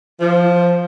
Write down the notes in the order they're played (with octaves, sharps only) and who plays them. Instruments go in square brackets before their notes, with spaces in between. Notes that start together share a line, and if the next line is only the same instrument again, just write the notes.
[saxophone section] F3